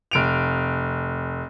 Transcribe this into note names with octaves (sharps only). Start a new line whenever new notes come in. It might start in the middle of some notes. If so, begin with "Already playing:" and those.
F1 D7 F7